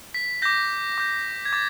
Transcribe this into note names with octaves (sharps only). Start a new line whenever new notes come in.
B6
D6 G6 A#6
D6 G6
G#6
D6 A6